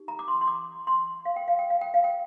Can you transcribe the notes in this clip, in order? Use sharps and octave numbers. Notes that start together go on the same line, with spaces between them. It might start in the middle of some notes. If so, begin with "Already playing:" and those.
Already playing: D#4 G4
A#5
D6
C6
C6
D6
C6
F5
G5
F5
G5
F5
G5
F5
G5